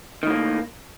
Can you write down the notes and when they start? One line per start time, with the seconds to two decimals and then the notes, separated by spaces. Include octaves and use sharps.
0.23 D#3
0.27 A2
0.30 A#3